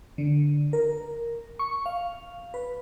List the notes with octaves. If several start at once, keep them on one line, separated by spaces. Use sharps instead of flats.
D3
A#4
C#6
F5
B4